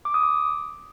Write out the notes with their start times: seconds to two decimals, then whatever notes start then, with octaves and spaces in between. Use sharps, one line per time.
0.05 D6
0.14 D#6
0.23 D6